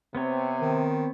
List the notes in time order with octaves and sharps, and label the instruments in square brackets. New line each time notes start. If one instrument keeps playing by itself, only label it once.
[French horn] C3 [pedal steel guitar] B3 C4 C#5
[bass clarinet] D#3